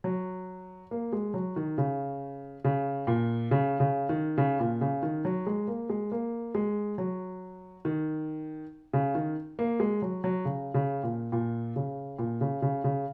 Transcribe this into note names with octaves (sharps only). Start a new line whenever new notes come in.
F#3
A#3
G#3
F#3
D#3
C#3
C#3
A#2
C#3
C#3
D#3
C#3
A#2
C#3
D#3
F#3
G#3
A#3
G#3
A#3
G#3
F#3
D#3
C#3
D#3
A#3
G#3
F#3
F#3
C#3
C#3
A#2
A#2
C#3
A#2
C#3
C#3
C#3